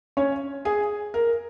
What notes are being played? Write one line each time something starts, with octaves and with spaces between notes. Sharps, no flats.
C#4 C#5
G#4
A#4